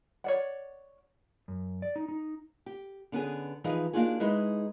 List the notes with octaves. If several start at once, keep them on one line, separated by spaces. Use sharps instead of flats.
C#5 D5 F#5
F#2
D5
D#4
D#4
G4
D3 B3 C#4 G#4
E3 F3 D#4 G#4 B4 D#5
A#3 D4 D#4 F4 F#4 G#4
G#3 D#4 E4 G#4 B4 D#5